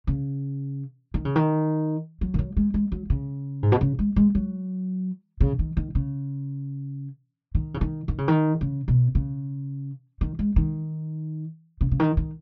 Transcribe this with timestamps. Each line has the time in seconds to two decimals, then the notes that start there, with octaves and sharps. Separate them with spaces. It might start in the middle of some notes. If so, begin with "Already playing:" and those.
0.07 C#3
1.14 D#3
1.25 C#3
1.36 D#3
2.21 F#3
2.34 D#3
2.39 F#3
2.57 G#3
2.74 G#3
2.92 F#3
3.10 C#3
3.63 G#2
3.72 B2
3.81 C#3
3.99 G#3
4.16 G#3
4.35 F#3
5.41 C#3
5.59 D#3
5.77 D#3
5.95 C#3
7.55 D#3
7.74 C#3
7.81 D#3
8.08 D#3
8.18 C#3
8.28 D#3
8.61 C#3
8.88 B2
9.15 C#3
10.21 D#3
10.39 G#3
10.56 D#3
11.81 C#3
11.91 C#3
12.00 D#3
12.17 D#3